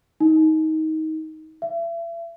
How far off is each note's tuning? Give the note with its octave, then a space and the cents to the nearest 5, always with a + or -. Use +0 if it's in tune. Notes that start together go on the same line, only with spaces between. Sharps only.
D#4 +20
E5 +35